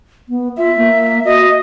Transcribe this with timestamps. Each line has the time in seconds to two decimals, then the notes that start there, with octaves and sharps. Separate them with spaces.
0.29 B3
0.57 F4 E5
0.77 A#3
1.25 F#4 D#5